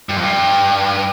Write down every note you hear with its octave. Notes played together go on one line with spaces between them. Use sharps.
G2
F2
G2